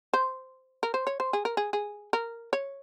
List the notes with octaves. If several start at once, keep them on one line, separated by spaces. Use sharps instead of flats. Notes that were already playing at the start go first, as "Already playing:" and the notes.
C5
A#4
C5
C#5
C5
G#4
A#4
G#4
G#4
A#4
C#5